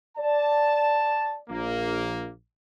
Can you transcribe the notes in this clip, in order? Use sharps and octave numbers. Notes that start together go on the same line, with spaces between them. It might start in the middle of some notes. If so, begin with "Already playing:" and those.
D5 A5
A#1 A#3